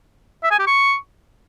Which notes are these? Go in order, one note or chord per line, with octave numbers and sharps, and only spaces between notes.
E5
G#5
G4
C#6